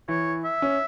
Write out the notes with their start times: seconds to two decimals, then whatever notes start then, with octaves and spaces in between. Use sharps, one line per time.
0.08 E3 C#5
0.45 E5
0.62 C#4